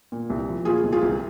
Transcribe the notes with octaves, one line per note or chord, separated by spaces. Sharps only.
A#2
C2
F3
A#2 F4 G#4
C2
F4 G#4
C2